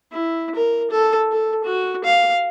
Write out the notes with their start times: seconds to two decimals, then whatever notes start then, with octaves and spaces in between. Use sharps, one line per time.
0.13 E4
0.55 A#4
0.91 A4
1.32 A4
1.64 F#4
2.04 F5